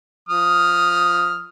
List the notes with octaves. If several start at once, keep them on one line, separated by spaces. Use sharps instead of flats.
F3 D#6 F6